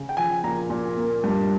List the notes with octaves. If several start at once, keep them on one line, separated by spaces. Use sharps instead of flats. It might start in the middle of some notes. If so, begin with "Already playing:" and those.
Already playing: C#3
G5
F3 G#5
A#2 A#5
A#2
A#3
G2